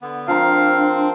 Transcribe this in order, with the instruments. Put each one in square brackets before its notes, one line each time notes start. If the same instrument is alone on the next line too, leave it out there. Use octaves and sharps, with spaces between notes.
[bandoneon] D3 B3
[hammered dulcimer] F3 A#4 [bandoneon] C4 [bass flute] D4 [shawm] F5